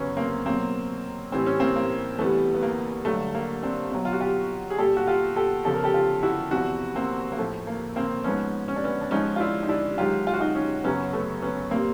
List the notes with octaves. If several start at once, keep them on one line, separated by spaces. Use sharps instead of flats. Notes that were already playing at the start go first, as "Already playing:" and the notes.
Already playing: F#2 C#3 F#3 B3 C#4
A#3 C4
B2 F#3 A#3 C4
A2 E3 G3 C4
C#4
A#3 C4
A#3
E2 C3 E3 G3 A3 B3
B3
A#3
G2 D3 F#3 A3
A#3
C4 D4
B2 F#3
F4
F#4
F4 G4
G#4
A#2 G3 G4 A4
F#4
F4 G4
G4 A4
E2 C#3 F3 A4
A#4
G4 A4
F4 G4
E4 F#4
E2 C3 F3 E4 F#4
A#3 C4
A#3
A2 F3 A3
A#3
A#3 C4
G#2 F3 B3 C#4
C#4
D4
B3 C#4
D4
G#2 F3 C#4 D#4
F4
D4 E4
D#4
D4 E4
G#2 D#3 F#3 F4 G4
F4
F#4
D#4 F4
C#4 D#4
F#2 C#3 F#3 B3 C#4
A3 B3
B3 C#4
A#2 G3 A#3 C4